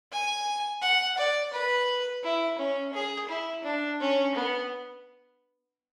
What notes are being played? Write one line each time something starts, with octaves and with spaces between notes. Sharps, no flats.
G#5
F#5
D5
B4
E4
C#4
G#4
E4
D4
C#4
B3